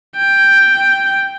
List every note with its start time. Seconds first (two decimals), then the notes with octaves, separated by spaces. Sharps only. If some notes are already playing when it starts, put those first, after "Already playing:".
0.17 G5